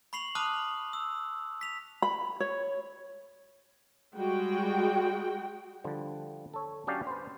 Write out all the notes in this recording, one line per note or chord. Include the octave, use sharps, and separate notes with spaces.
B5 C#6 C7 F7 F#7
A5 B5 D6 D#6 F6 F#6
E6
B6 F7
B5
C#5
G3 G#3 F#4 G5
D3 F3 G3
A4 C#5
F#3 C#4 D4 G4 D5 F5
B4 C5